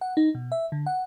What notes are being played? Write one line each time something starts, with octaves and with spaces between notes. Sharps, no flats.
F#5
D#4
B2
E5
D3
F#5